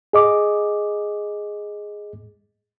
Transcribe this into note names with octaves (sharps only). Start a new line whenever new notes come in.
G#4 D#5 D6